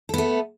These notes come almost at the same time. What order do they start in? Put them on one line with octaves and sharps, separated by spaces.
A4 B3 A3